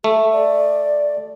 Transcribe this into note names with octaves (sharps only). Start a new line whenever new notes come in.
A3 A4
D5